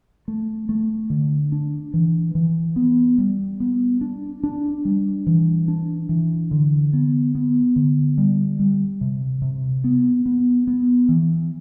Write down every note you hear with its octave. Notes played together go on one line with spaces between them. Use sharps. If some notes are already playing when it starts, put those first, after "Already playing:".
A3
A3
D3
D4
E3
E3
B3
G3
B3
D4
D4
G3
E3
D4
E3
D3
B3
B3
D3
G3
G3
C3
C3
B3
B3
B3
E3